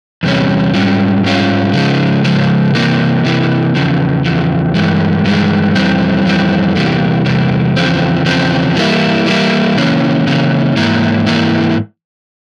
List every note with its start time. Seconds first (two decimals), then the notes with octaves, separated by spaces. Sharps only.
0.23 E2 C3 G3 C#4
0.74 G#2 G3 C#4 F4
1.24 G#2 G3 C#4 F4
1.73 C#3 F3 G#3
2.24 C#3 F3 G#3
2.75 C3 E3 A#3
3.24 C3 E3 A#3
3.75 E2 C#3 F3
4.25 E2 C#3 F3
4.75 G2 E3 G#3
5.25 G2 E3 G#3
5.75 F2 E3 G3 C4
6.25 F2 E3 G3 C4
6.75 E2 C3 E3 G3 A#3
7.26 E2 C3 G3 A#3
7.76 E2 C#3 F3 C4
8.26 E2 C#3 F3 C4
8.76 E3 G3 A#3 E4
9.26 E3 G3 A#3 E4
9.76 C#3 E3 A#3 C#4
10.27 C#3 E3 A#3 C#4
10.76 G#2 E3 A#3 E4
11.26 G#2 E3 A#3 E4